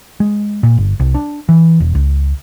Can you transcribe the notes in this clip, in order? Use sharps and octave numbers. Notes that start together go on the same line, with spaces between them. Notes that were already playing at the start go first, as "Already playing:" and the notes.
G#3
A#2
G1
C2
D4
E3
E1
C#2